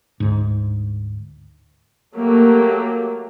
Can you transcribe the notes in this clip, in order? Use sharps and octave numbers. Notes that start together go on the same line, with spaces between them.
D2 G#2
F#3 A3 A#3 G4